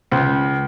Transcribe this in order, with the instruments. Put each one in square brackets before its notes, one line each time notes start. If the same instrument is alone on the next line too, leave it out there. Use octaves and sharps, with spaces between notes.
[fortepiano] C#2